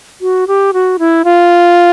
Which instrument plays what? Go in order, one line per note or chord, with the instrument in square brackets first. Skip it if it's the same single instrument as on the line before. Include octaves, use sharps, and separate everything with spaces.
[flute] F#4
G4
F#4
E4
F4